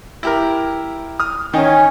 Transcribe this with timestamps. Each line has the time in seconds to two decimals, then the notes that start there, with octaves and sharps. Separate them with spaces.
0.23 E4 G4 A#4
1.20 D#6 F6
1.54 D#3 C#4 D#4 G#5